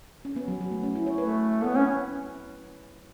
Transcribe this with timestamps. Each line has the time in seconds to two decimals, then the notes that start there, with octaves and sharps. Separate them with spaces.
0.25 C#4
0.36 B3
0.48 F#3
0.61 F#3
0.71 A3
0.83 C#4
0.95 E4
1.06 C#5
1.18 A3 B4
1.64 B3 C#5
1.76 C#4 B4